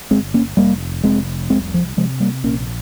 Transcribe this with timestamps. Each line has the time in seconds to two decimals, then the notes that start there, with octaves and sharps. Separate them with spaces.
0.11 G1 G#3 C4
0.34 A#3 C#4
0.57 F1 G3 A#3
1.04 F1 G#3 C4
1.50 C2 G#3 C4
1.74 F3
1.97 C3 F3 G#3
2.20 G3 A#3
2.44 A#1 A#3 C#4